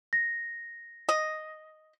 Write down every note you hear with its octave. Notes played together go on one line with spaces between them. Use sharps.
A#6
D#5